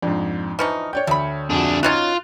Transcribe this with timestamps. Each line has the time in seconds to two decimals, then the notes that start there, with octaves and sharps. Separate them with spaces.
0.02 F2 G#2 D4
0.59 E3 F3 D#4 C#6 F6 C#7
0.93 C#5 D5 G5 G6
1.07 D2 A3 B5
1.50 F2 D4 F#4 G#4
1.83 C#4 D#4 F4 F#4 F#6 A6